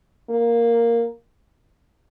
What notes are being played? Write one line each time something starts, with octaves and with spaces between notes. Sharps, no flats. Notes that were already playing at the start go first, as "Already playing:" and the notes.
A#3